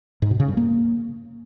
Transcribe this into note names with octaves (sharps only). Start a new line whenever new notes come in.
G#2
B2
C#3
G2
A#3